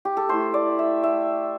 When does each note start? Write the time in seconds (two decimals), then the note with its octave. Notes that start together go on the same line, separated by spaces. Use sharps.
0.05 G4
0.17 A4
0.29 A3 E4 C5
0.54 D5
0.79 E5
1.03 E5